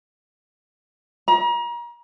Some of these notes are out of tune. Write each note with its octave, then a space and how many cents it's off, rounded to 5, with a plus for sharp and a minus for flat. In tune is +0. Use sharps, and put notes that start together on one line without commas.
A#5 +35